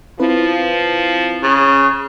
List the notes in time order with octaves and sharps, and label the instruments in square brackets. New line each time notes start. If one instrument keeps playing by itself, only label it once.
[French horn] F3 [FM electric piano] C4 E4 B4
[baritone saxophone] C#3